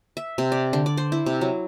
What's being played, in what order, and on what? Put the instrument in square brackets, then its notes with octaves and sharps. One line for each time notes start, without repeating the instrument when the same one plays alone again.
[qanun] E5
C3
D5
D3
D5
C5
E4
C3
F#3